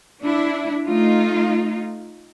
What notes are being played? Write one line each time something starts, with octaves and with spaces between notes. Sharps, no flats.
D4 E4
A3 D#4 F4